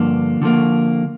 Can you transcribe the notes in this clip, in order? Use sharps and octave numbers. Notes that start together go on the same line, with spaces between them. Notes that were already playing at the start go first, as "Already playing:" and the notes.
Already playing: G2 D3 F3 A#3 D4
D3 F3 A#3